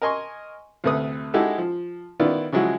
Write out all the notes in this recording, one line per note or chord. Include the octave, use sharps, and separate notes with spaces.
A#4 D#5 G#5 C6 C#6
D2 C3 A3 B4 D#6
G#3 D#4 E4 F#4 G4 A4
F3
D#3 B3 E4 F4 D5
C#3 F3 F#3 G#3 E4 F#4